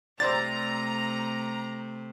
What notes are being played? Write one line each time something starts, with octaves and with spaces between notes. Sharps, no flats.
C2 C3 A3 C5 D5 A#5 A6